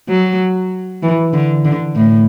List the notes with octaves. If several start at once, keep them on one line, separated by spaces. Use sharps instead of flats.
F#3
E3
D3
D3
A2